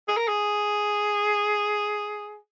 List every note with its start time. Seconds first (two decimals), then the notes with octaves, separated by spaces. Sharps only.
0.08 G#4
0.17 A#4
0.28 G#4